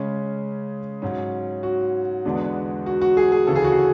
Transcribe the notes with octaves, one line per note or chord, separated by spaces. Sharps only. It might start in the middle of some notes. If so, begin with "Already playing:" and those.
Already playing: C#3 G#3 C#4
G#2 F#3 C#4
F#4
E2 D3 G#3 B3 D4
F#4
F#4
G#4
G#4
D2 C#3 E3 A4
G#4
F#4
G#4